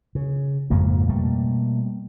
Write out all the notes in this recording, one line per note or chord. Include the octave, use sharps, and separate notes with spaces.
C#3
F2 G#2 C#3 A#3
B2 G3 A3 A#3